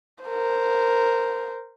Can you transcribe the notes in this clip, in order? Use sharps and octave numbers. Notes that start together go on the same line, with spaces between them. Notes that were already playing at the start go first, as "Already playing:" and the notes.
A#4 C5